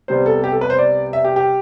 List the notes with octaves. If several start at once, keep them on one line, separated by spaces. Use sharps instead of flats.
C2 C3 G3 B3 C5
A4
G4
A4
B4
C5
D5
E5
G4
G4